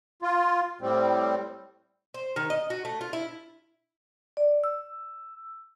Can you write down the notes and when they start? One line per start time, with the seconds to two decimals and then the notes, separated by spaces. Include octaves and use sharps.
0.22 F4
0.81 A2 G3 C4
2.14 C5
2.36 D#3
2.50 D#5
2.70 F#4
2.85 A3
3.01 F4
3.13 E4
4.37 D5
4.64 E6